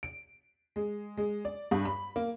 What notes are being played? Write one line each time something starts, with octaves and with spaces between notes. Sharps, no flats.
D7
G#3
G#3
D5
G2
B5
A#3